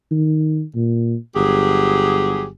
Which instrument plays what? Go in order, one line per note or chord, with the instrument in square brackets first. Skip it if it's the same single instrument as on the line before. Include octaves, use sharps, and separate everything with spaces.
[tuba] D#3
A#2
[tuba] G1 [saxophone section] F#3 G4 G#4